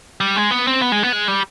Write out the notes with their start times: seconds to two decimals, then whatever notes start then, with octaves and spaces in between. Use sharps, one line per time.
0.20 G3
0.36 G#3
0.51 B3
0.67 C4
0.81 B3
0.92 G#3
1.03 B3
1.12 G#3
1.28 G3